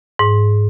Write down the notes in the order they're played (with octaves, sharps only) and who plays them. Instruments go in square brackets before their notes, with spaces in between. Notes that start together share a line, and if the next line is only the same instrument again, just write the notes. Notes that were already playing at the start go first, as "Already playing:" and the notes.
[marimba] G#2